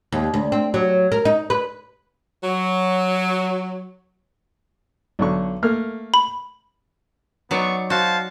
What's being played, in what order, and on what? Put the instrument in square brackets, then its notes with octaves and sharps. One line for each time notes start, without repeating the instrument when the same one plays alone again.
[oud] D#2
D2
C4
F#3
A#4
D#4
B4
[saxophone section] F#3
[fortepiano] B1 D3 C#6
A3 A#3 F6
[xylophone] B5
[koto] F#3 D#4 D5 [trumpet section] B3 C#6
[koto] F#4 [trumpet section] C5 F5 A5